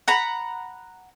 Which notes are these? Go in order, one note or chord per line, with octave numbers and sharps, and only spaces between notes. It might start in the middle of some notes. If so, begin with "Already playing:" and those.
F#5 A#5 B5